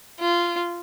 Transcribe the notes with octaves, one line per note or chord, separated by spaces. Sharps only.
F4